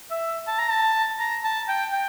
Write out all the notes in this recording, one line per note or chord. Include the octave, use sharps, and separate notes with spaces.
E5
A5
A#5
A5
A#5
A5
G5
G5